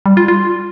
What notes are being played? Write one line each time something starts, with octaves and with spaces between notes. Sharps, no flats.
G3
F4
F4